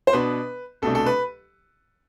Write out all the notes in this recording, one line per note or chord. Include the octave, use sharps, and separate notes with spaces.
C5
B2 B3 D4 B4
C2 B2 A3 D4 A4
A4
B4